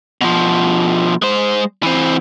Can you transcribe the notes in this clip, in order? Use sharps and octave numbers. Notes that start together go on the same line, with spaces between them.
B2 F3
G#3 C5
E3 C4